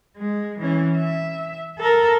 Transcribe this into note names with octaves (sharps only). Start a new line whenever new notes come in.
G#3
E3 C#4
E5
A4 A#4